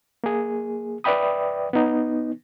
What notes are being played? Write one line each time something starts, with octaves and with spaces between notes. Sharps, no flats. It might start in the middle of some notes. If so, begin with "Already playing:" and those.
A#3 G#4
B4 D5 E5 G5 B5 D#6
B3 D#4